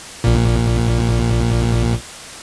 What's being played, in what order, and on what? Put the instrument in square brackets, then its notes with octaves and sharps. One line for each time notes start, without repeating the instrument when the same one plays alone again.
[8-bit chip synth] A#1 A#2